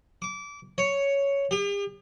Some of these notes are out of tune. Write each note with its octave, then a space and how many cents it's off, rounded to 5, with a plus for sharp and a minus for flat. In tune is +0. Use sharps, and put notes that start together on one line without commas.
D6 -25
C#5 +5
G4 +45